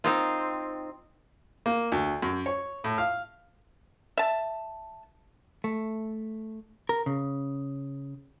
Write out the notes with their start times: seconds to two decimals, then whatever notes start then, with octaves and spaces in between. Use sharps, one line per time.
0.04 C4 D#4 F4
1.66 A#3
1.92 D2
2.22 F#2
2.46 C#5
2.84 A2
2.98 F5
4.18 E5 A5
5.64 A3
6.89 A#4
7.06 C#3